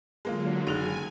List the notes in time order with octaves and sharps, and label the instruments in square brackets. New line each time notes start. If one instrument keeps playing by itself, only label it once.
[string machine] D3 F#3 [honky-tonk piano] G#3 A#3 F4
[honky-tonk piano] F#1 [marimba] D#4 F#4 G#4 [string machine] G#5